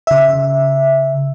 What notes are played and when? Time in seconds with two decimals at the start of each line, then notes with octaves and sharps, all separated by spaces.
0.07 C#3 E5